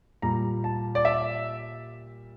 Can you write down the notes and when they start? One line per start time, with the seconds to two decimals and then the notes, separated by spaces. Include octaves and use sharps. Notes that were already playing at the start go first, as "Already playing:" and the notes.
0.22 A#2 G3 A#5
0.64 A5
0.95 D5
1.05 E5